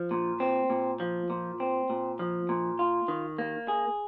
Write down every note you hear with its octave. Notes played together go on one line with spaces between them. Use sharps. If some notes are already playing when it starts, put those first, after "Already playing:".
Already playing: F3
A#2
C4
A#2
F3
A#2
C4
A#2
F3
A#2
F4
D#3
A#3
G#4